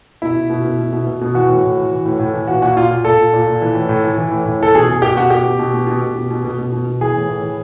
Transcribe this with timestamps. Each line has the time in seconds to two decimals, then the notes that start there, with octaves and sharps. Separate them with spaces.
0.22 B2 E4
0.36 B2
0.50 B2
0.65 B2
0.79 B2
0.92 B2
1.07 B2
1.21 B2
1.34 E3 F#4
1.49 A2
1.64 A2
1.77 E3
1.91 E3
2.05 A2
2.19 A2
2.33 E3
2.47 A#2 F#4
2.62 A#2 F#4
2.77 A#2 F4
2.91 A#2
3.05 A#2 A4
3.18 A#2
3.34 A#2
3.47 A#2
3.62 E3
3.75 A2
3.89 A2
4.04 E3
4.18 E3
4.31 A2
4.45 A2
4.60 E3 A4
4.75 B2 G#4
4.88 B2 G#4
5.02 B2 G4
5.17 B2 F#4
5.30 B2 G4
5.45 B2
5.59 B2
5.74 B2
5.87 B2
6.02 B2
6.16 B2
6.31 B2
6.45 B2
6.58 B2
6.72 B2
6.87 B2
7.01 E3 G#4
7.15 A2
7.29 A2
7.43 E3